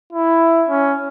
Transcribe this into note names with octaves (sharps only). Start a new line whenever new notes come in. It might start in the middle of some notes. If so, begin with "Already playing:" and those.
E4
C#4